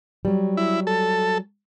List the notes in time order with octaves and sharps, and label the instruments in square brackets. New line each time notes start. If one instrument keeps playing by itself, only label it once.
[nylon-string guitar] F#3 G3
[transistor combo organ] E4
A4